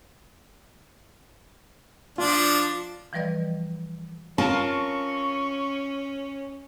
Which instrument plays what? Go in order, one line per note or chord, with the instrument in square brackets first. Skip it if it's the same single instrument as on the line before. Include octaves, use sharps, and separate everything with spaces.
[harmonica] F3 D4 [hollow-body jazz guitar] F4
[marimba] E3 F3 G3 B4 D5 D#5
[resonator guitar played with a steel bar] C4 F4 A#4 [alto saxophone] C#4 [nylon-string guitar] A5 [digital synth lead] C#6